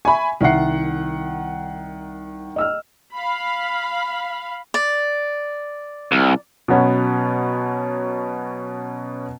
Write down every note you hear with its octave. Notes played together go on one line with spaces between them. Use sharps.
E5 G#5 B5 C#6
C2 D#3 E5 F#5 C7
D#5 E6 F6
F5 B5
D5
C2
B2 F#3 B3 C#4